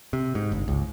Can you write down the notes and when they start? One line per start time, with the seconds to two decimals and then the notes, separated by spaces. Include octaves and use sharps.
0.13 C3
0.35 G#2
0.52 G1
0.68 C#2